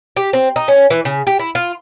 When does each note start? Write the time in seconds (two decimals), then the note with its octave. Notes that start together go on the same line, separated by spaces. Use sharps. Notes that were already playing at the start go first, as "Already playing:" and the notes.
0.17 G4
0.33 C4
0.56 D#4
0.68 C#4
0.90 E3
1.05 C#3
1.27 G4
1.39 E4
1.55 F4